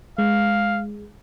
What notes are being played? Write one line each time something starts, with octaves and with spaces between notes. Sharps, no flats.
G#3 F5